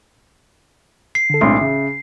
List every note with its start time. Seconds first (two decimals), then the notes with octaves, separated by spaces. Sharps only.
1.15 C7
1.30 D3 A4
1.41 B1 A2 G#3 C4 D4 C6
1.61 C#3 E5